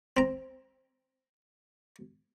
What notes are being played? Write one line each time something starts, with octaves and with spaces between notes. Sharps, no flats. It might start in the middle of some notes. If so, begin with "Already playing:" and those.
C4 A#5